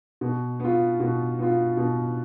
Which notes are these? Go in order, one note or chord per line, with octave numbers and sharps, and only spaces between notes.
B2
B3 F4
B2
B3 F4
B2